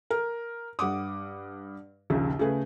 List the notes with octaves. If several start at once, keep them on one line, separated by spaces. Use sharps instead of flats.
A#4
G2 F#5 D6 D#6
A#1 D#2 C#3
C#3 A3 G#4 B4